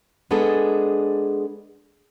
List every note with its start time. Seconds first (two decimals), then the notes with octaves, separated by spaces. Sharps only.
0.31 G#3 B3 D4 G#4 A4